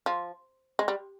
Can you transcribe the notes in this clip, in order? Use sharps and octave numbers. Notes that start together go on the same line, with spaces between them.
F3
G#3
G3